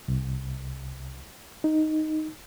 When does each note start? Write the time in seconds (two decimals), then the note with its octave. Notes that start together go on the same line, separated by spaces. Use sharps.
0.08 C2
1.64 D#4